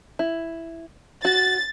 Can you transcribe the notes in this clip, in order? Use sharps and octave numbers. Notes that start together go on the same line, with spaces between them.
E4
F#4 A6